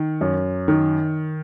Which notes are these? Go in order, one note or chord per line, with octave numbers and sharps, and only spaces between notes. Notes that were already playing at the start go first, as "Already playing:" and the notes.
Already playing: D#3
F#2
D#3